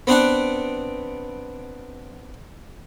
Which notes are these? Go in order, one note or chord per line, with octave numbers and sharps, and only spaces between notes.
B3 C4 D4 F#5